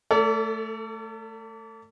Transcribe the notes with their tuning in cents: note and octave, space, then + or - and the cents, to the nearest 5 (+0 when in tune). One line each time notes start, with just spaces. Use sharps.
A3 +0 A4 +40 D5 -35